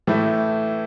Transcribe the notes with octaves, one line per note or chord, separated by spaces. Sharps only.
A2 E3 A3 E4